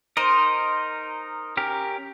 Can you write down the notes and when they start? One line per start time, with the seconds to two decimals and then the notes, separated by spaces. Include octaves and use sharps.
0.17 D#4 A#4 C5 D#5
1.57 C#4 G4 A#4